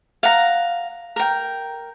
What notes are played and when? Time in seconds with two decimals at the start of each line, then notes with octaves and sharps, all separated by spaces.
0.23 F5 F#5 A#5
1.16 A#4 G5